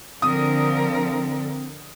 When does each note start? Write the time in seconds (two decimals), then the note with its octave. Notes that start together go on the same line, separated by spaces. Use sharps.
0.22 D3 F3 C4 A#4 D#6